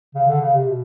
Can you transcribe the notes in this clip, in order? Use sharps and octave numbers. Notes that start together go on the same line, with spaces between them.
C#3
D3
C#3
C3
B2